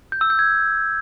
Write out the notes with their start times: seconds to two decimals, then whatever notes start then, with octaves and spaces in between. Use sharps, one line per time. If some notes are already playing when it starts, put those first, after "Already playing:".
0.12 G6
0.21 E6
0.30 G6
0.39 G#6